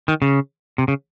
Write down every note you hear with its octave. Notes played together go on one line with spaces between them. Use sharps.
D#3
C#3
C3
C#3